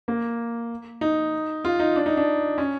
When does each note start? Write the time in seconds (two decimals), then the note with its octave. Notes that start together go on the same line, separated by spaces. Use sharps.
0.08 A#3
1.01 D#4
1.65 F4
1.80 D#4
1.96 D4
2.06 D#4
2.17 D4
2.58 C#4